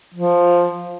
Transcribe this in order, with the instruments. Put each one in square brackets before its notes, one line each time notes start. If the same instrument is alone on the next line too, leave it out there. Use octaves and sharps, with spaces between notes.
[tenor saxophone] F3